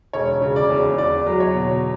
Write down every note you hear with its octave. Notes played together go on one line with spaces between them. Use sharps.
E1 C#5
C#3
D5
E2
E2 D5
F#3
C#5
B2